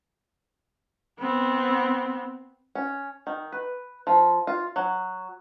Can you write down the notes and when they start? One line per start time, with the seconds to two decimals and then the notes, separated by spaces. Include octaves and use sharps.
1.20 B3 C4
2.75 C#4
3.27 D#3
3.52 B4
4.07 F3
4.47 F4
4.76 F#3